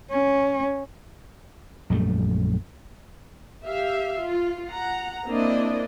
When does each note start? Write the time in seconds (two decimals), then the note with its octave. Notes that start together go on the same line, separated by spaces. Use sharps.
0.11 C#4
1.90 A#1 F#2 G3 A3
3.65 G4 E5 F5
4.21 F4
4.69 F#5 A#5
5.27 A#3 C4 D4 E4 D5 D#5